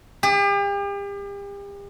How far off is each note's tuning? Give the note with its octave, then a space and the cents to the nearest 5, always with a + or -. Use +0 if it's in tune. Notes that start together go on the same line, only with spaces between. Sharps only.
G4 +40